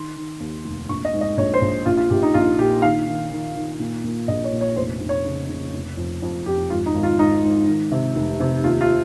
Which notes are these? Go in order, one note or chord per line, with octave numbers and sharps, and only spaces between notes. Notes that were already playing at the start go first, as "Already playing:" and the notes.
Already playing: D#3 C6
D#3
D#2
F1
A#1 C#6
D#5
G#2
D#5
A#1 C#5
C5
A#1
A#1 F4
F4
A#1 G4
D#4
A#1 F4
A#2 G4
D#3 F5
D#3
D#3
D#3
A#2
A#2
A#1 D#5
C#5
A#2
C#5
F1 C5
F1
C#5
C#3
C#3
F1
F2
F2
F2 G4
G#1 F4
D#4
G#1
F4
G#2 D#4
G#2
D#3
C3
F1
C3
D#2 F4
F4